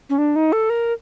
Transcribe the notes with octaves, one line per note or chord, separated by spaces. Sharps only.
C#4
D4
D#4
A4
A#4